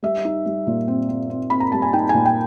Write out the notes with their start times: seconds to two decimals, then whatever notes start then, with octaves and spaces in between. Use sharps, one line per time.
0.03 G3 E5
0.25 D#4
0.46 G3
0.67 A#2
0.88 C4
1.09 C4
1.30 C4
1.50 C4 B5
1.60 A#5
1.72 G3 A5
1.82 G#5
1.93 D#4 G5
2.09 A#2 G#5
2.26 G5